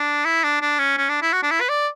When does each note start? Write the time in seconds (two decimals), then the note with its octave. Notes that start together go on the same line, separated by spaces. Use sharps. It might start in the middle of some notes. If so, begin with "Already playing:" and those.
Already playing: D4
0.25 E4
0.44 D4
0.62 D4
0.79 C#4
0.97 C#4
1.09 D4
1.22 E4
1.33 F#4
1.43 D4
1.51 E4
1.61 B4
1.69 D5